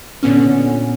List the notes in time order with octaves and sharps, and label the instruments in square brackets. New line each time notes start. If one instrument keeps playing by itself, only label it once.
[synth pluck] A#2 D3 B3 C#4